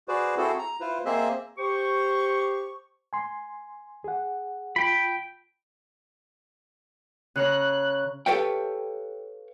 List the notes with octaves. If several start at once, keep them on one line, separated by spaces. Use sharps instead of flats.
F#4 G#4 B4 C5 D5
C4 E4 F#4 G#4 A4 C5
A#5
E4 F4 B4 C5
A#3 C4 G#4 C5 D#5 E5
G4 C5 C#6
G#5 C6
G#4 F#5
F4 G5 B5
C#3 C#5 A#5 F#6
G4 A4 B4 C#5 F5 G5